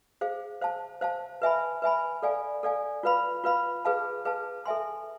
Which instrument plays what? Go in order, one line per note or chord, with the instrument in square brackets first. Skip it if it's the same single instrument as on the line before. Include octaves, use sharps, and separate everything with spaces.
[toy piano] G#4 C5 F5
C5 F5 A5
C5 F5 A5
B4 E5 G#5 B5
B4 E5 G#5 B5
A4 D5 F5 G#5
A4 D5 F5 G#5
F4 B4 F5 B5
F4 B4 F5 B5
G#4 B4 F5 A5
G#4 B4 F5 A5
A4 E5 G#5 C6